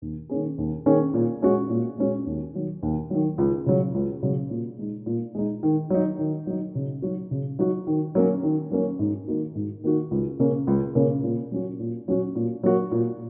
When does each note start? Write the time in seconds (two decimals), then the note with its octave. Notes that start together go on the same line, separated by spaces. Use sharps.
0.02 D#2
0.29 D#3 A#3 C#4 G#4
0.58 D#2
0.86 D#3 A#3 C#4 G#4
1.14 A#2
1.42 G#3 C#4 F#4
1.70 A#2
1.98 G#3 C#4 F#4
2.26 D#2
2.54 D#3 F#3
2.82 D#2
3.10 D#3 F#3
3.38 C#2
3.66 C#3 F#3
3.94 C#2
4.23 C#3 F#3
4.50 A#2
4.78 G#3 D#4
5.06 A#2
5.35 G#3 D#4
5.63 D#3
5.90 F#3 D#4
6.19 D#3
6.47 F#3 D#4
6.75 C#3
7.02 F#3 D#4 F#4
7.31 C#3
7.59 F#3 D#4 F#4
7.87 D#3
8.15 F#3 A#3 C#4
8.43 D#3
8.71 F#3 A#3 C#4
8.99 G#2
9.28 D#3 A#3 D#4 F#4
9.55 G#2
9.84 D#3 A#3 D#4 F#4
10.11 C#2
10.39 C#3 A#3 C#4
10.67 C#2
10.95 C#3 A#3 C#4
11.24 A#2
11.51 F#3 C#4 F#4
11.80 A#2
12.08 F#3 C#4 F#4
12.35 A#2
12.63 F#3 A#3 F#4
12.92 A#2